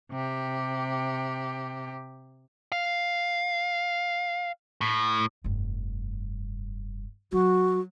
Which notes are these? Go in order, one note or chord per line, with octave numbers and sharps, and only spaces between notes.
C3 G4
F5
A2
F1 G2
F#3 F#4